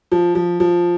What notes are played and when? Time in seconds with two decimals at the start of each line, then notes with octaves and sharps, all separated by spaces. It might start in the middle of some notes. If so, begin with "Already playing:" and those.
0.12 F3
0.35 F3
0.60 F3